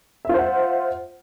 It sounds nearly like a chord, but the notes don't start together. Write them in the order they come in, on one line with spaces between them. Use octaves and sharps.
E5 F4 C5 F#5